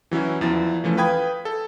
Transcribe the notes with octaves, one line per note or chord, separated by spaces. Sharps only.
E3 F#3 C#4 E4
E2 F3 E4 A6
E3 F3 A3 C#4
B4 F5 G5 B5 D#6 G#6
A4